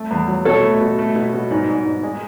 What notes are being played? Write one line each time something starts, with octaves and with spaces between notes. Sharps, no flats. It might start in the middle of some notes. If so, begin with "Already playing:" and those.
Already playing: A3
E2
F#3
B2 A4 C#5
A3
B2
A3
B2
B2
G#2
G#2
G#2
G#3